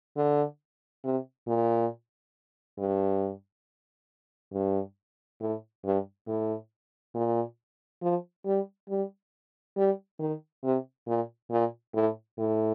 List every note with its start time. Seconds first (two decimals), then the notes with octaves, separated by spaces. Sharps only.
0.16 D3
1.04 C3
1.48 A#2
2.78 G2
4.53 G2
5.40 A2
5.84 G2
6.27 A2
7.15 A#2
8.02 F3
8.46 G3
8.89 G3
9.77 G3
10.19 D#3
10.63 C3
11.07 A#2
11.51 A#2
11.94 A2
12.38 A2